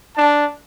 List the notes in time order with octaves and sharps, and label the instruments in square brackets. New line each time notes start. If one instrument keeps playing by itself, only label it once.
[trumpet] D4 [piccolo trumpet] A5